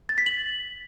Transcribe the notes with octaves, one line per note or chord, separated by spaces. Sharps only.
A6
B6
F#7